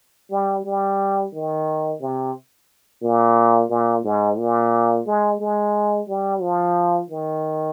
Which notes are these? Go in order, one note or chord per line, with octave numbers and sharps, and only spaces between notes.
G3
G3
D#3
C3
A#2
A#2
G#2
A#2
G#3
G#3
G3
F3
D#3